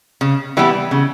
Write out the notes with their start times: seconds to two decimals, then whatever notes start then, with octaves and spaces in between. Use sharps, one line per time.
0.21 C#3
0.57 E3 G3 B3
0.91 C#3